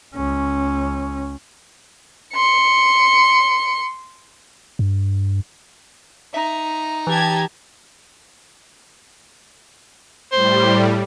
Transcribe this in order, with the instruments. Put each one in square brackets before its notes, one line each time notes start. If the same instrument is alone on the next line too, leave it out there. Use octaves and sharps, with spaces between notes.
[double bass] C#2 C#4
[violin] C6 C#7
[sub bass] G2
[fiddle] D#4 A#5 [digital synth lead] E5
[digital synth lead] E3 [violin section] G4 A5 G#6
[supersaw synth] A2 G3 [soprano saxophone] C5